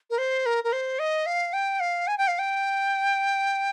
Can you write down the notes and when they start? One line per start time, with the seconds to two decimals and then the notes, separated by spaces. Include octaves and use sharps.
0.10 A#4
0.18 C5
0.46 A#4
0.64 A#4
0.73 C5
0.99 D#5
1.26 F5
1.53 G5
1.80 F5
2.07 G#5
2.18 G5
2.28 F5
2.39 G5